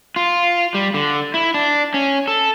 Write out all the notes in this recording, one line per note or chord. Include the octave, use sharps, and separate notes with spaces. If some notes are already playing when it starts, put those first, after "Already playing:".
F4
G3
D3
E4
D4
C#4
A4